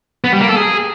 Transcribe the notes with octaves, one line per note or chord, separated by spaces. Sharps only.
B3
G3
A#3
A4
G#4